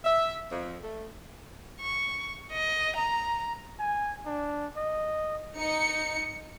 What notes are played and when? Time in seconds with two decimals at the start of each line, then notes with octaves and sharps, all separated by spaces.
0.04 E5
0.51 F2
0.83 A3
1.81 C#6
2.52 D#5
2.96 A#5
3.79 G#5
4.26 D4
4.77 D#5
5.57 D#4 C#7